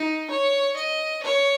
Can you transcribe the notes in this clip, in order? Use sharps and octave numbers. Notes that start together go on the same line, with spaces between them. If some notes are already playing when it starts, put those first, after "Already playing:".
Already playing: D#4
C#5
D#5
C#5